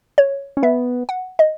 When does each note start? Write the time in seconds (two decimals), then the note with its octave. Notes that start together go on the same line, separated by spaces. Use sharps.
0.18 C#5
0.57 C#4
0.63 B3 E5
1.09 F#5
1.39 D#5